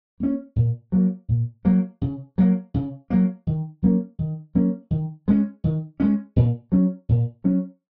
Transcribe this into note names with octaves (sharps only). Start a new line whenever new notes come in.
A#3 C#4
A#2
F#3 A#3
A#2
F#3 A#3
C#3
F#3 A#3
C#3
F#3 A#3
D#3
F#3 A#3 C#4
D#3
F#3 A#3 C#4
D#3
G#3 C#4
D#3
G#3 C#4
A#2
F#3 C#4
A#2
F#3 C#4